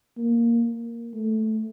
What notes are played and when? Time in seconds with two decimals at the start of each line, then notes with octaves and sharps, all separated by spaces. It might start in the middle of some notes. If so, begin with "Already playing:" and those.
0.17 A#3
1.14 A3